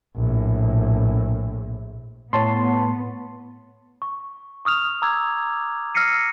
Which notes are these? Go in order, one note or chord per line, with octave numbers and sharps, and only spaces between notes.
A#1 A2
A2 B3 C#5 A5 C6
C#6
C#6 D#6 F6 F7
A#5 D6 E6 G#6
E6 F6 A#6 C7 C#7 D#7